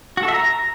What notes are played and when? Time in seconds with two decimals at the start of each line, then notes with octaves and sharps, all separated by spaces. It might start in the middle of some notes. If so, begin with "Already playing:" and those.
0.17 F#4
0.23 A4
0.28 E5
0.34 A#5